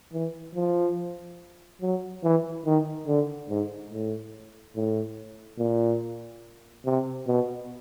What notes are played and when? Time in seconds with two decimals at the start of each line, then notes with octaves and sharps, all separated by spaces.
0.13 E3
0.55 F3
1.82 F#3
2.24 E3
2.66 D#3
3.07 D3
3.49 G#2
3.91 A2
4.76 A2
5.59 A#2
6.86 C3
7.27 B2